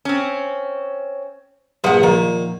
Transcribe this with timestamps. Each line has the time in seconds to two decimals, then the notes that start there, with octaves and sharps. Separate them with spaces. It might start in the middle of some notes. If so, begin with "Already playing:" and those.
0.05 C4 C#4
1.84 A#1 G2 F3 F#5
2.03 A#2 D#3 F3